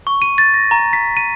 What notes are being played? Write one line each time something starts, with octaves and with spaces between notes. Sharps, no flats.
C#6
D#7
A6
A#6
A#5
B6
D#7